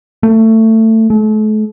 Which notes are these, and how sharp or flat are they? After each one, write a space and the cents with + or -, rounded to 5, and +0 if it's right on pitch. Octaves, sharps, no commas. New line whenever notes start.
A3 +20
A3 -40